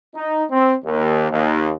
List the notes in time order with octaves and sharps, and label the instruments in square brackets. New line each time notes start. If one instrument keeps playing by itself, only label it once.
[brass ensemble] D#4
C4
D#2
D#2